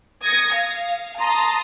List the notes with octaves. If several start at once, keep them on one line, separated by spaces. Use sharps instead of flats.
D#6 G#6 A#6 C#7
F5
A5 A#5 C6 D#6